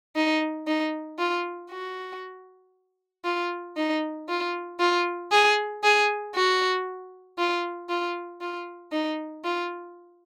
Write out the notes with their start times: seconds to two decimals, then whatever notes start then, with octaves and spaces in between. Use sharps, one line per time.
0.16 D#4
0.67 D#4
1.18 F4
1.70 F#4
3.25 F4
3.77 D#4
4.28 F4
4.80 F4
5.32 G#4
5.84 G#4
6.35 F#4
7.38 F4
7.90 F4
8.41 F4
8.92 D#4
9.44 F4